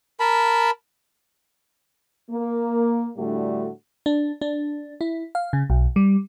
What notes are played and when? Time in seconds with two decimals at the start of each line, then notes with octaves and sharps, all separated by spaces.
0.20 A#4 A5 B5
2.31 A#3
3.17 A2 D3 G3 A3 D4 F#4
4.06 D4
4.41 D4
5.01 E4
5.35 F5
5.53 C#3
5.70 B1
5.96 G3